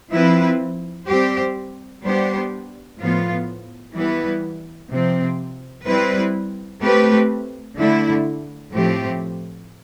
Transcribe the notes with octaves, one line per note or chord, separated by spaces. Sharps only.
F3 C4 E4 B4
G3 C4 G4 C5
G3 B3 D4 G4 C5
A2 F3 B3 F4
E3 G3 B3 E4 B4
C3 F3 C4
G3 C4 E4 B4
A3 C4 G4 B4
D3 A3 E4
A2 F3 A3 C4 G4